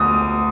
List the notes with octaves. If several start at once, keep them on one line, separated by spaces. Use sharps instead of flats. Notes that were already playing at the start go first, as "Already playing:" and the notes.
Already playing: D2 D#6